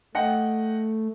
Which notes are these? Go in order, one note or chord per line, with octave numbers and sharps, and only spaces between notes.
A3 D#5 F#5 G5